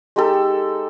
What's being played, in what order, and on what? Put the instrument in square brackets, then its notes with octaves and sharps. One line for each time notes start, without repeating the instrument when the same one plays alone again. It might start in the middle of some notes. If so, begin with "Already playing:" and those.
[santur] G#3 D#4 G4 A4